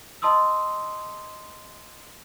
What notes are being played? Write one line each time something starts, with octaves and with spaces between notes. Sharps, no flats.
D#5 A5 C6 D#6 E6